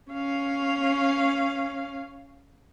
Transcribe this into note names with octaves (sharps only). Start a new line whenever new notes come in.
C#4 F5